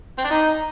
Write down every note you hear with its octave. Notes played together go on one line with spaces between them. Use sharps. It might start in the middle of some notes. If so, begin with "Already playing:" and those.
C4
D4
D#4